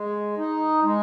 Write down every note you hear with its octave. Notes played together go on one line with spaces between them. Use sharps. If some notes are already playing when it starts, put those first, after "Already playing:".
Already playing: G#3
D#4
G#3